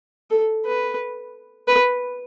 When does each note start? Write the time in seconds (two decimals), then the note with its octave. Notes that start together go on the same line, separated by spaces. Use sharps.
0.30 A4
0.65 B4
1.68 B4